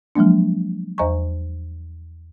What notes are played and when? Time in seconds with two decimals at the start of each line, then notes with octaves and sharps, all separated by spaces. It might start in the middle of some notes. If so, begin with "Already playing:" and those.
0.16 F3 F#3 G#3 A#3 D4
0.98 E2 C5 D#5 G#5 A#5 C#6